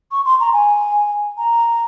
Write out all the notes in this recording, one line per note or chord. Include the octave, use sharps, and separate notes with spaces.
C#6
C6
A#5
G#5
A#5